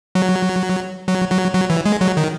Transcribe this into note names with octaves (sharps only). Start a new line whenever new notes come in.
F#3
F#3
F#3
F#3
E3
G#3
F#3
D#3